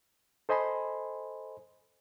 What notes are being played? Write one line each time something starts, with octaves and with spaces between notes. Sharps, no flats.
A4 C5 D#5 G#5 B5 C6